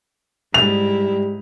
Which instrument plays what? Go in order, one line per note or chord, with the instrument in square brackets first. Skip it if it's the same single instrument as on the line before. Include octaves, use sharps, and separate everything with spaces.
[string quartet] G#2 E4 [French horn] G3 [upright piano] F7